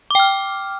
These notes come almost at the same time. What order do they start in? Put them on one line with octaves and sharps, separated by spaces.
D6 G5 F6